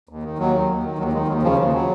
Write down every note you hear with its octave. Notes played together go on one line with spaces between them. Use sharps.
D#2
D#3
D#2 F#3
D#3
D#2
D#3
D#2 F#3
D#3 G#3
D#2 F#3
C#3 F3
D#2 F3
C#3 F#3